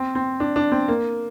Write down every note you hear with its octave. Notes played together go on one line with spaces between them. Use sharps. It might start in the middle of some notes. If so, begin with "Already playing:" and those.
Already playing: C4
C4
D4
D4
C4
A#3